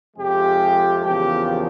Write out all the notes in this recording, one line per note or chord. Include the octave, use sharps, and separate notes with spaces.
F2 C3 F3 G#3 G4
E2 C#3 F3 A#3 G4